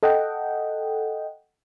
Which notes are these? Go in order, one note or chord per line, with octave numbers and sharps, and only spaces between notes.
A4 D#5 F#5 G5